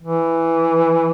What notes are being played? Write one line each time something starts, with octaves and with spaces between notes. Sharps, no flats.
E3